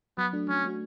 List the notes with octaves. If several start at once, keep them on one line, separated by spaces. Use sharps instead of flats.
F#3 B3
A3 D4 F#4
F#3 C#4
A3 D4 F#4